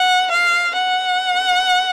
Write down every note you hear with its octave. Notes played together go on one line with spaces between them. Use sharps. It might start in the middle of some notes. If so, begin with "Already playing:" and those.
Already playing: F#5
F5
F#5